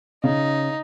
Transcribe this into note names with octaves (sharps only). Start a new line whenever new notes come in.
C#3 D#4